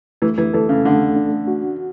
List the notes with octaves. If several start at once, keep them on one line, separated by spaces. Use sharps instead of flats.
E3 A3
E3
E3 A4
C#3
D3 A3
D4
F#4